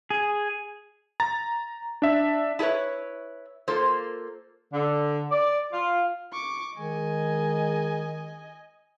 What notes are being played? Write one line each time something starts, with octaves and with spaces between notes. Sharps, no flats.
G#4
A#5 A6
D4 E5
E4 G#4 A4 B4 C#5
A#3 F4 A4 C5
D3
D5
F4
C#6 D6
D#3 G#3 D#5 G#5